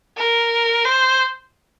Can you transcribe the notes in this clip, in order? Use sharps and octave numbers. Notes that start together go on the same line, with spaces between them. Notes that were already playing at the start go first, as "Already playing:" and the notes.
A#4
C5